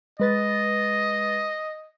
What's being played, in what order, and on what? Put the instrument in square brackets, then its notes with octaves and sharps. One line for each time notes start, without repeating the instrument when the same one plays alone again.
[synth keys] G#3 B4 A6 [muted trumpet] D#5